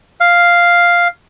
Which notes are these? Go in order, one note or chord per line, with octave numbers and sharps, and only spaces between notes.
F5